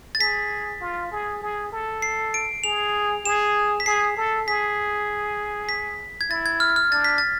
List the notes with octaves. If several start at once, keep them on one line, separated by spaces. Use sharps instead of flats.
A6
G#4 B6
F4
G#4
G#4
A4
C7
D7
G#4 F7
G#4 E7
B6
G#4 C7
A4
G#4 B6
B6
G#6
E4 A6
G#6
F6
F6
D4 A6
B6
A6